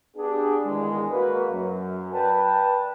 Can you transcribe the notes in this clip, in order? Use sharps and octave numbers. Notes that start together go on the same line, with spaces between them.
B3 D4 G4 G#4
E2 G2 D#3 G#3
A#3 F#4 B4
F#2
B4 D5 G5 A5